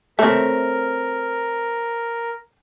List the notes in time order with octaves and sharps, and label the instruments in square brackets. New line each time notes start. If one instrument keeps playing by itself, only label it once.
[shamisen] A3 [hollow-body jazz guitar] C4 C#5 E5 [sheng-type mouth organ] A#4